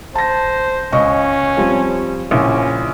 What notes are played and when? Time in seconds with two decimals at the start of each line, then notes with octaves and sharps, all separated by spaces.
0.15 C5 A5 A#6
0.92 C#2 C#4 D#5 C#6
1.57 F3 G3 C4
2.31 A#1 C#3 C#4 E4